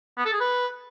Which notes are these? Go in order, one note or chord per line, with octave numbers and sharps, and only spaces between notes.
B3
A4
G#4
B4